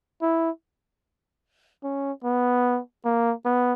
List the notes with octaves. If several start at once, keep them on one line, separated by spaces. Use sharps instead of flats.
E4
C#4
B3
A#3
B3